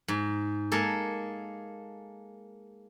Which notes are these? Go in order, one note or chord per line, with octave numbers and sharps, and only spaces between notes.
G#2
G#3 A#3 A4